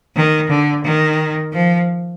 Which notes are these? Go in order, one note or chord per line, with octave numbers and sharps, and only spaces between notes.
D#3
D3
D#3
F3